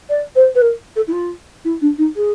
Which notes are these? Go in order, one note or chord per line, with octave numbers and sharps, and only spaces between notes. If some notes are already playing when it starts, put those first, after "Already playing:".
D5
C5
B4
A#4
A4
E4
F4
E4
D4
D#4
G#4